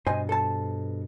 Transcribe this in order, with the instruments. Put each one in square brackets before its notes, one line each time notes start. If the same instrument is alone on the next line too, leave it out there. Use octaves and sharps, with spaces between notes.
[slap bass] G2 B2 [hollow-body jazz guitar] C5 D#5 G#5
[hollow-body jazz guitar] A4 C5 A5